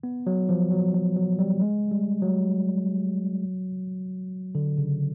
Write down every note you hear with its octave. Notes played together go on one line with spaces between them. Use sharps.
B3
F#3
F3
F#3
F#3
F#3
G3
G#3
G3
F#3
D3
C#3